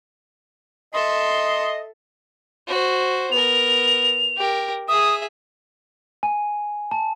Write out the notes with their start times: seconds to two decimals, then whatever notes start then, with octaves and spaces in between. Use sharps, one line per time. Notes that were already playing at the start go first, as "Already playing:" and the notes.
0.94 A4 D#5 E5 C6
2.68 F#4 C5
3.32 B3 A#4 F7
4.37 G4 A#4
4.88 G#4 E5 D#6
6.23 G#5
6.91 A5